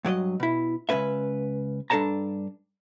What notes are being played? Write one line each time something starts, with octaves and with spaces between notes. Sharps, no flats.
G2 F#3 D5 D#5
B2 E4
C#2 F#2 C#4 B4 E5
G2 D4 A4 C#5 A5 A#5